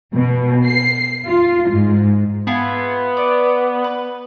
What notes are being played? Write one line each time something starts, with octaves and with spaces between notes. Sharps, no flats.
B2
C7
F4
G#2
B3 E4 F4 G#4
D5
B4